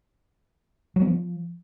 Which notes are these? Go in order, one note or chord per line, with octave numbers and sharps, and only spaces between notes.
F#3
B3
F3